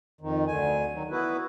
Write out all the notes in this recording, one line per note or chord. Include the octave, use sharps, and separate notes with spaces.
F2 D#3
D2 D3 G#5
D#3 F#3
B3 E4 F#4 B4